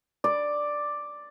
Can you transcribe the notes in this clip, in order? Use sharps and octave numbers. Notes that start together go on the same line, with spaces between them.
D5